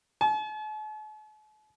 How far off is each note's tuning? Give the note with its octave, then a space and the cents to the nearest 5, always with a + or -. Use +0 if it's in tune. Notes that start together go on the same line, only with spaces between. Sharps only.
A5 -45